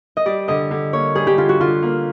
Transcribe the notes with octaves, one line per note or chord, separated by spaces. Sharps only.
D#5
G3 D5
D3 D#5
D3
A#3 C#5
G3 G#4
G4
D3 F4
F#4
D3 F4
A#3